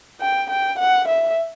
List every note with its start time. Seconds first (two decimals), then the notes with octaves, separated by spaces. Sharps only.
0.20 G5
0.49 G5
0.78 F#5
1.08 E5